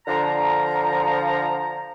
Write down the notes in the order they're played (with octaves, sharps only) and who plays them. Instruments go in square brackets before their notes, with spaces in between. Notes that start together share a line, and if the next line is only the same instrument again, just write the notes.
[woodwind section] D3 F3 A#5